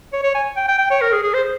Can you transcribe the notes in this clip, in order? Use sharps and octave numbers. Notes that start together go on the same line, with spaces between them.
C#5
C#5
G#5
G5
G5
G5
C#5
A#4
G#4
G#4
C5